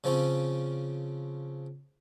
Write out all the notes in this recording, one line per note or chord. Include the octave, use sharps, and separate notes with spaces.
C#3 F3 C4 C#4